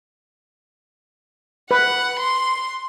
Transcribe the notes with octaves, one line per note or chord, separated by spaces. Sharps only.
B4 F#5
C6